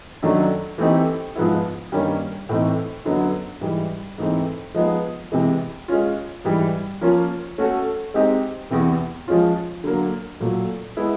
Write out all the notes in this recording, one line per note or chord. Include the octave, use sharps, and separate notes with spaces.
F#2 D#3 F#3 A3 D4
E3 A3 C4 D#4 G4
G#2 F3 G#3 B3 E4
G2 D#3 G3 A#3 C#4
A2 E3 A3 C4 D#4
F#2 D3 F#3 B3 D#4
G#2 E3 G3
G#2 E3 A3 C4 D#4
F3 G#3 B3 D#4 G#4
C3 E3 G#3
G#3 C#4 F4
G#2 E3 G3
F3 A#3 C#4 F4
A3 C#4 F#4 A4
G#3 C4 D#4 G4
E2 C3 E3
F3 G#3 C#4 F4
D3 F#3 A#3
A#2 F#3 A3
G#3 B3 E4